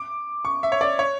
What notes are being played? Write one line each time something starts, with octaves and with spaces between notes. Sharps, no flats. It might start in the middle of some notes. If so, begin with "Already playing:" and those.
Already playing: D6
C#6
E5
C#5
D5
C#5